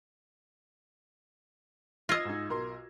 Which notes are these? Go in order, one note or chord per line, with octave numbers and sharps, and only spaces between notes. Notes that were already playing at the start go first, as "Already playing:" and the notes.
F4 D#5 E6 G#6 A#6
G#2 D#4
B1 A#4 C6